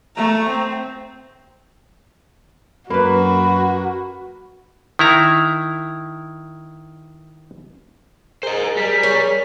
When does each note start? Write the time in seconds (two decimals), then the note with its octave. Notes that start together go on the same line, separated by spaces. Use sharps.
0.16 A3 A#5
0.49 C4
2.90 F#2 A#3 F#4 B4 B5
4.99 D#3 E4 A#5
8.43 G#4 A#4 C5 D#5
8.77 G3 B6
9.03 C#4